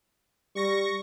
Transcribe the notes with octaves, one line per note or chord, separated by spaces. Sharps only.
G3 C#6 A#6